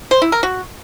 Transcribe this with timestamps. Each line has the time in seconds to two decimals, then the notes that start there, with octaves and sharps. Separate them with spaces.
0.11 C5
0.22 E4
0.32 A#4
0.43 F#4